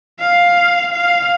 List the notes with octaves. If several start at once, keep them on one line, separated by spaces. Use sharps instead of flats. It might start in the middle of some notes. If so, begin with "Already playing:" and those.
F5
F5